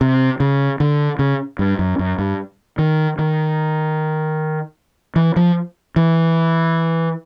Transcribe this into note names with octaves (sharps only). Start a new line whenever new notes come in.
C3
C#3
D3
C#3
G2
F#2
F#2
G2
D#3
D#3
E3
F3
E3